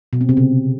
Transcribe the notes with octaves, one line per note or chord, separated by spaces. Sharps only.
B2
C4
C3
C#3